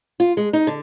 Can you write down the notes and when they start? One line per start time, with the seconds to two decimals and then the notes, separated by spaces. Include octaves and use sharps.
0.20 F4
0.37 G#3
0.53 D#4
0.67 D3